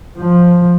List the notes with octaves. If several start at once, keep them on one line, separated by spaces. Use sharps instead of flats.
F3